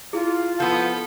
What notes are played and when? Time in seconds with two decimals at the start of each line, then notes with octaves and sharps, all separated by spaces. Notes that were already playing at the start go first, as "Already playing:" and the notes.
0.13 E4 F4 G#4
0.60 F3 B3 A4